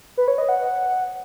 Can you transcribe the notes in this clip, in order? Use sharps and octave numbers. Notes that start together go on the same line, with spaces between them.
B4
C#5
D#5
F#5